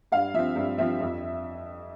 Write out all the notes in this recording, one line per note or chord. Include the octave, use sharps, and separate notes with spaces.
G2 F5
F3 C4 E5
G2
F3 C4 E5
F2